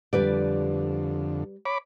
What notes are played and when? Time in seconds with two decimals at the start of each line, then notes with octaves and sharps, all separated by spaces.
0.13 F2 D3 G3 B4 D5
1.66 C#5 B5 D6